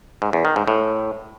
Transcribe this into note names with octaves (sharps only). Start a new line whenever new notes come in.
G#2
E2
D#3
G#2
A2